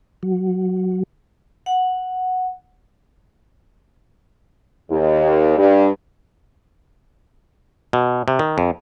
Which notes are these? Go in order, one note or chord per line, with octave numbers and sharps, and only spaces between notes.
F#3
F#5
D#2
G2
B2
C3
D#3
F2